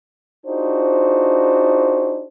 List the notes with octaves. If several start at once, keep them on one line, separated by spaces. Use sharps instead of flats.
D4 D#4 F4 F#4 G#4 C5